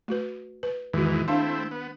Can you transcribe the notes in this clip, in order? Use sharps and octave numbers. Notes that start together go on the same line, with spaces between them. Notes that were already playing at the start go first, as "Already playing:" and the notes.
A3 F#4 B4
B4
E2 G#2 D#3 E3 F#4
A3 C4 D4 E4 F5 C6
B3